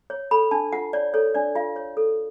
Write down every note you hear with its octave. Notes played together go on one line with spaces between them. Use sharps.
C#5
A4 B5
D4 A5
F4 F#5
C#5 D5
A4 C#5
D4 D5
F4 F5
C#5
A4